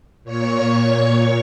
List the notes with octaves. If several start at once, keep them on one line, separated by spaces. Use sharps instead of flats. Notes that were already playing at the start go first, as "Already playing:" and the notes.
A#2 C#5 C#6